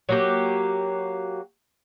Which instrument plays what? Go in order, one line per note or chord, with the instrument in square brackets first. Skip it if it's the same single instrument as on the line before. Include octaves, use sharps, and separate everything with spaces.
[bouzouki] F#3 A#3 G4